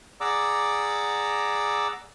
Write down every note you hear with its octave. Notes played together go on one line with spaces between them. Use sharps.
G#4 D5 F#5 A#5 D6 E6